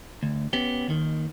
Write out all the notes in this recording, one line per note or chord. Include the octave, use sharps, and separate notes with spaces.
D2
B3 C#4 G4
D#2 D#3